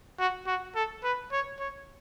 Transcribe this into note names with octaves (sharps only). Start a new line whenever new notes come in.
F#4
F#4
A4
B4
C#5
C#5